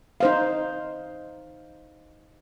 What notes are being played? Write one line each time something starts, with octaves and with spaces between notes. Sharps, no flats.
D#4 C5 F5